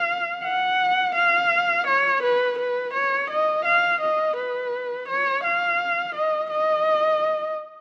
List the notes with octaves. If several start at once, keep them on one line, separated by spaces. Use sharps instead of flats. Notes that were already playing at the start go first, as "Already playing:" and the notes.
Already playing: F5
F#5
F5
C#5
B4
B4
C#5
D#5
F5
D#5
B4
C#5
F5
D#5
D#5